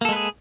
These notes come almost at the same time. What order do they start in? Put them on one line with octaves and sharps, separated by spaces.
A#3 A4 G#3 B4 G#4